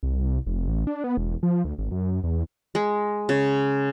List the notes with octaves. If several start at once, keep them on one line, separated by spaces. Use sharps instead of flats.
C2
F1
A1
D4
B3
E1
F3
D2
G#1
F#2
F#2
E2
G#3
C#3